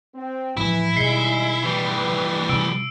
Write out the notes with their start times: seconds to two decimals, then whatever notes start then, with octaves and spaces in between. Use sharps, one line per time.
0.14 C4
0.57 A2 E3 F3 G#3 E4
0.97 B2 D#3 G3 G#3 C7 C#7 G7
1.64 E3 G3 B4
2.49 C3 C#4 E6 D7